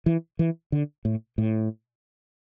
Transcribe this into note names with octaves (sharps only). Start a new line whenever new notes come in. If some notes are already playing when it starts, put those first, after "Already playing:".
E3
E3
D3
A2
A2